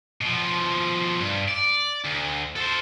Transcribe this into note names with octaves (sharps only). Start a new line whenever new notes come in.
B2 F3
G2
D5
D2
A4 C5